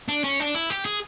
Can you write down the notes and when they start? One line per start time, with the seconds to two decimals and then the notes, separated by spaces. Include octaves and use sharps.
0.08 D4
0.24 C#4
0.40 D4
0.55 E4
0.70 G4
0.85 G#4